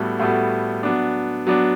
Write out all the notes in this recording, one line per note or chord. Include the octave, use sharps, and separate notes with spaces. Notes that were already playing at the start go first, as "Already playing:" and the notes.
Already playing: A2 G3 B3 F#4 A4
A2 G3 B3 F#4 A4
F#3 B3 D4
F#3 B3 D4